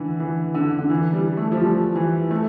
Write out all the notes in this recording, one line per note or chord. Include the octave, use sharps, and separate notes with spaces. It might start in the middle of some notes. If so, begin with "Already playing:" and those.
Already playing: D3 E3
E3
D3
D3
E3
G3
A3
F3
G3
E3
A3